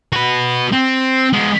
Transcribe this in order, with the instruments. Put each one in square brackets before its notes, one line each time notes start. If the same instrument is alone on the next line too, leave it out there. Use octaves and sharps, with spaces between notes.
[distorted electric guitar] F#4 B4
C4
G#3 B3